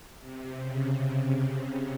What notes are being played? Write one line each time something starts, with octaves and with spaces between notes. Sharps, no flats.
C3
C#3